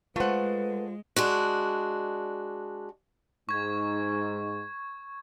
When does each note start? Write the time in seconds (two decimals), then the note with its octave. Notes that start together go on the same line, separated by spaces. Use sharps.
0.16 G#3 A3 F4 B4 C5 F#5
1.16 G#3 D4 F#4
3.49 G#2 C#6 G#6